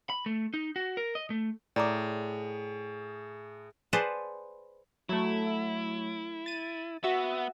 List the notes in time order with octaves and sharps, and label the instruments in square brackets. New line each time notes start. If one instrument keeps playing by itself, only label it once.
[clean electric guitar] B5
A3
D#4
F#4
A#4
D#5
A3
[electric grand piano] A2 [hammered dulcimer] G#4 [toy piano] D5 A#5 D6
[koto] G#4 B4 C5 D5 F#5 A5
[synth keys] F#3 A3 [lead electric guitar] E4
[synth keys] A6 D#7
[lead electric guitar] B3 [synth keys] F#4 E5